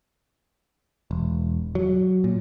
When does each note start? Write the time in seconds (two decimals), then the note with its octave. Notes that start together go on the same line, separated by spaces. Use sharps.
1.11 E1
1.75 F#3
2.24 A#2